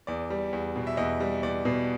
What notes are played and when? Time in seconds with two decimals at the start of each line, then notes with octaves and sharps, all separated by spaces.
0.07 E2 D5
0.30 G3
0.53 E2
0.76 B2
0.87 E5
0.97 E2 D#5
1.20 G3
1.43 E2 D5
1.65 B2